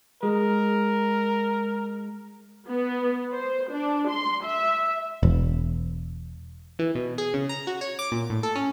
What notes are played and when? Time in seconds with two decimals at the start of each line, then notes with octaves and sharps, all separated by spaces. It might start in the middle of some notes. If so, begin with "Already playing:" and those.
0.23 G#3 A#4
2.69 B3
3.35 C5
3.71 D4
4.10 C6
4.46 E5
5.23 E1
6.79 E3
6.95 B2
7.18 G#4
7.34 C#3
7.49 A#5
7.67 F#4
7.81 C#5
7.99 D6
8.12 A#2
8.30 A2
8.43 A4
8.55 C#4